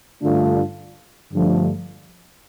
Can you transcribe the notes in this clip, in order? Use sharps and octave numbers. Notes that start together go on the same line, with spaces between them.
G2 D3 A3 D4 F4
G2 D3 F3 A3